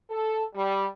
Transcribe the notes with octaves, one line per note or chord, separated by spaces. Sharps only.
A4
G3